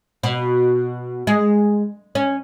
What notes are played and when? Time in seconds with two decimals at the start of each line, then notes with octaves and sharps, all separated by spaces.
0.23 B2
1.27 G#3
2.15 C#4